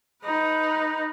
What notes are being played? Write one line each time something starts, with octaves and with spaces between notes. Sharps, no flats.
D#4 B4